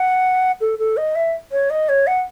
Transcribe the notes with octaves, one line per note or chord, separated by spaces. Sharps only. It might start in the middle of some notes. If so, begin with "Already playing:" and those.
Already playing: F#5
A4
A4
D#5
E5
C#5
D#5
C#5
F#5